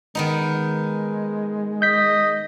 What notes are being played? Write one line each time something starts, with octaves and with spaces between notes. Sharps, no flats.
D#3 G#3 B3 D#4
D#5 G6 B6